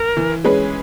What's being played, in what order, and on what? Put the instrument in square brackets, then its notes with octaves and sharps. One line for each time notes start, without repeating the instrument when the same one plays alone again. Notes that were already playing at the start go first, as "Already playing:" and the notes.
Already playing: [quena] A#4
[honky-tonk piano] E3
G#3 C#4 G#4 B4